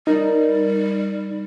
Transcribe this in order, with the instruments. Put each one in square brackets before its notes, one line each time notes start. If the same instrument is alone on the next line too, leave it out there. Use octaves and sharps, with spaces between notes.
[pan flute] G3 [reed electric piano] D#4 [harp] A#4